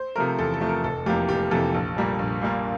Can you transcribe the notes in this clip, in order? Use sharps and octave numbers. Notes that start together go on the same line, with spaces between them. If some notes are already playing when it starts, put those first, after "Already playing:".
Already playing: C5
C3 F3 A3 A#4
E2 A4
A4
C3 F3 A3
A#4
F1 A4
F2 C3 E3 A#3 G4
F1 G4
F2 C3 E3 A#3 A4
A#1
A#2 G3 A#3
A#1
A#2 G3 A#3